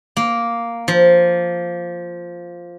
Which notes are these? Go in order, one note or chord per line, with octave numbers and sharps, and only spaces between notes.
A#3
F3